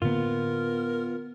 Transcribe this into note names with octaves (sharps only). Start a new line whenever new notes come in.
A2 D3 A#3 B3 F4 A#4